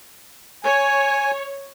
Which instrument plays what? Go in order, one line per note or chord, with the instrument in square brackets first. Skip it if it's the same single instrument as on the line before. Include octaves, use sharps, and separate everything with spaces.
[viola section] C#5 [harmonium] G#5